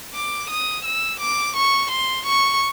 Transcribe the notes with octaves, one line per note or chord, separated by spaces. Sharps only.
D6
D#6
E6
D6
C#6
C6
C#6